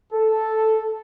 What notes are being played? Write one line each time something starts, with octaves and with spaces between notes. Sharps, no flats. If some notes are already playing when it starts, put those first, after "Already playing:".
A4